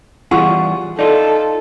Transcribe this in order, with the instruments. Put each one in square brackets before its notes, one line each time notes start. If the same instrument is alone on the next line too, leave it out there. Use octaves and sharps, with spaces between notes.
[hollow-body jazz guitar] E2 G3 G#4 [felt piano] F4 F#5 C#6
[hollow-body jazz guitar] D#4 F4 [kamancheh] A4 [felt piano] D5